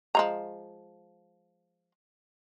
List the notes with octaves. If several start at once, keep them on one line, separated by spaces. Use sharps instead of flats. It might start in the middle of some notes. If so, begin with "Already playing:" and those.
F3 G#3 A#5